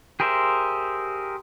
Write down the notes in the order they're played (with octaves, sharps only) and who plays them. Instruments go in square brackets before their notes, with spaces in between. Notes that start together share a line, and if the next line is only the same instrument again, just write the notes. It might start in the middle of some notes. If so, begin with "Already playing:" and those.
[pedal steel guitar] G4 G#4 A#4 C5 E5